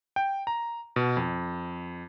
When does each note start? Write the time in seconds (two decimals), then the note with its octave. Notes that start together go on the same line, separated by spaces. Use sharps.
0.16 G5
0.47 A#5
0.96 B2
1.17 F2